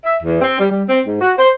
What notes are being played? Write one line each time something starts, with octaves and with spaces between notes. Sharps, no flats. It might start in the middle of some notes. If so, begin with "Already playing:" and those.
E5
E2
C4
G3
G3
C4
G#2
F#4
C5